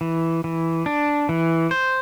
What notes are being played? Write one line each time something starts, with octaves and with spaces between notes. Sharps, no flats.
E3
E3
D4
E3
C5